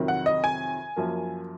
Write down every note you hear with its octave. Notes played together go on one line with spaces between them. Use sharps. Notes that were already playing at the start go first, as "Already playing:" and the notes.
Already playing: F2 C3 D#3 F#3
F#5
D#5
G#5
F#2 F3 A#3